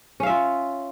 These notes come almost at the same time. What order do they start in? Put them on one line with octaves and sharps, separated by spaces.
C#4 F5 E5 F4